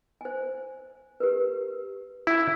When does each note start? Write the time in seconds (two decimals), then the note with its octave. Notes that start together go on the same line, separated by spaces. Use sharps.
0.21 C5 G#5
1.20 G4 A#4 B4
2.27 E4